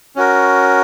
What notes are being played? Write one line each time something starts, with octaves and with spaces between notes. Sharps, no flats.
C#4 F#4 A#4